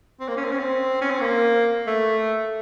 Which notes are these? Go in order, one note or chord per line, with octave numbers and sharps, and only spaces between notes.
C4
A#3
C#4
C4
C#4
C4
C#4
C4
A#3
A3